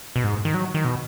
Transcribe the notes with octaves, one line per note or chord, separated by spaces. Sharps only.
B2
G#2
D#3
F#3
D#3
B2